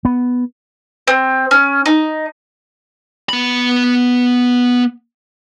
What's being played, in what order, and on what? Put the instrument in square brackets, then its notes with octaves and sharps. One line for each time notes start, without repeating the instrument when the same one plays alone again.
[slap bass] B3
[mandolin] C4
C#4
D#4
[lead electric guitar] B3 B5